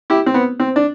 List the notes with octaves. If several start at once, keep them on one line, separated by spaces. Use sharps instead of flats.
E4 G4
C4
B3
C4
D4